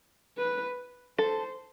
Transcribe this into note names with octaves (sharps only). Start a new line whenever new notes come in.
B4
A4 C5